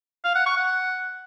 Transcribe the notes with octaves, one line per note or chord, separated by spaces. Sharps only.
F5
F#5
C#6
F#5